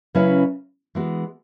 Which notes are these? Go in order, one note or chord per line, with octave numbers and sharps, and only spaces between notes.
C#3 F#3 C#4 E4 B4
E3 G#3 B3 F#4